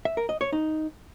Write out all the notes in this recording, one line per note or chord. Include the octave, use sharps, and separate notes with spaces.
E5
A#4
D#5
C#5
D#4